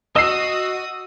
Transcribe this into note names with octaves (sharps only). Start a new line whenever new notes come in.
F#4 D#5 D#6 E6 C7